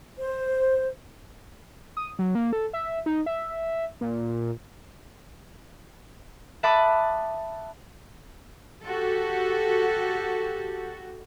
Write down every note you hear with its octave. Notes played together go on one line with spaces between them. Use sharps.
C5
D#6
F#3
A#3
A4
E5
D#4
E5
A#2
E5 F#5 A5 B5 D6 D#6
F#4 G4 A4